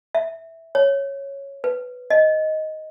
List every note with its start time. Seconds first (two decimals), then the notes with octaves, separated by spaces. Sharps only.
0.15 E5
0.75 C#5
1.64 B4
2.10 D#5